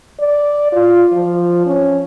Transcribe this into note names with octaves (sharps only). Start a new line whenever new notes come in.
D5
F4
F3
C#4